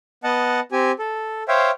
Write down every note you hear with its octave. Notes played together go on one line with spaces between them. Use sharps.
B3 D#5 F#5 A5
C4 G4 G#5
A4
C5 C#5 E5 F5 G5